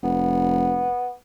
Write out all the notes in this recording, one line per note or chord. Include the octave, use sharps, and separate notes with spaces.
F1 B3